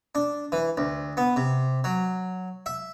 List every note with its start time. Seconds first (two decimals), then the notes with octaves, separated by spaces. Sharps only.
0.15 D4
0.52 E3
0.77 D2
1.17 B3
1.36 C3
1.84 F#3
2.66 E5